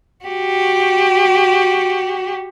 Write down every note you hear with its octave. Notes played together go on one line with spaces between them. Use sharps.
F#4 G4